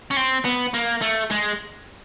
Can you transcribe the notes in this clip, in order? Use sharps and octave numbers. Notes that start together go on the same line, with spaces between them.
C#4
C4
B3
A#3
A3
G#3